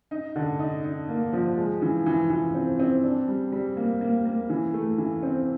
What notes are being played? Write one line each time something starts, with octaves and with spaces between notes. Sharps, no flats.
D#4
D3
D#4
D#4
A#3
F3
G#3
E3
E3
E3
C4
C4
D4
G3
G3
A#3
A#3
A#3
E3
A3
E3
C4